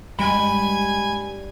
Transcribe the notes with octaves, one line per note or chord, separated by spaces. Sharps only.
G2 G3 G#3 G#5 B5